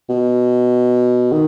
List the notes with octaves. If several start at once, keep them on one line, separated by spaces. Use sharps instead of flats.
B2
D#3